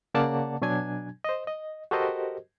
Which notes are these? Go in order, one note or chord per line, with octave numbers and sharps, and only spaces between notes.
C#3 A#3 D5 F#5 A5
B2 F#3 D4 G#5 G#6
C5 D#5
D#5
F#4 G4 A4 A#4 C5 D#5